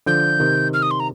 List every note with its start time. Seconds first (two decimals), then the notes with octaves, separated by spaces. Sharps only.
0.06 D3 F3 G6
0.40 C3 D#3
0.73 F6
0.82 D#6
0.91 C6
1.00 A#5